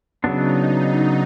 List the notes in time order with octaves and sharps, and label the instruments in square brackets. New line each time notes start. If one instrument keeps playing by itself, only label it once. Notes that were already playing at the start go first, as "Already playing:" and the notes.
[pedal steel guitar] C#3 F#3 B3 D4 [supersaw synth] D#4
[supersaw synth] D#4